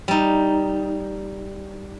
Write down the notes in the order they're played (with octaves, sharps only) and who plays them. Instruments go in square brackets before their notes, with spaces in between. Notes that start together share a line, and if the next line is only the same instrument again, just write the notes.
[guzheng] G3 D#4